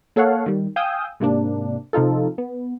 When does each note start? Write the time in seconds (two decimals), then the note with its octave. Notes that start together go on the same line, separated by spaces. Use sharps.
0.16 A#3 A4 C#5 F5 F#5
0.46 D#3 G3
0.76 F5 G5 G#5 D#6 E6 G6
1.20 G#2 C3 A#3 D4
1.93 C3 F3 D#4 F4 A4
2.38 B3